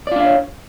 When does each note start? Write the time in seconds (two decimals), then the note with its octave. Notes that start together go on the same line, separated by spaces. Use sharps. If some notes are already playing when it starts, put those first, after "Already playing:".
0.07 D5
0.11 F4
0.16 D4
0.20 F5
0.25 C#5